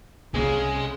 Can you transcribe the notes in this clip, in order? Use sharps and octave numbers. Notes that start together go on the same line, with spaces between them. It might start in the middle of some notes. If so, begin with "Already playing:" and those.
C2 C#3 G#3